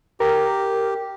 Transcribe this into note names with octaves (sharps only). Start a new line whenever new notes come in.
G4 A#4